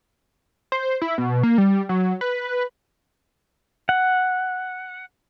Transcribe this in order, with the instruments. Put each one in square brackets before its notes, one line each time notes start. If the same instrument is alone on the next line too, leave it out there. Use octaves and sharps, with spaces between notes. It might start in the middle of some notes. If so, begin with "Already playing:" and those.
[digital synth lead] C5
E4
B2
A#3
G3
F#3
B4
[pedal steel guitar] F#5